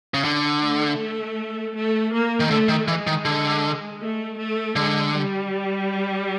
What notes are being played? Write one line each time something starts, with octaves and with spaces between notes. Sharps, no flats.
C#3
D3
A3
A3
A#3
D#3
D3 A3
D#3
E3 G#3
D#3
D3
A3
A3
D3 G#3
G3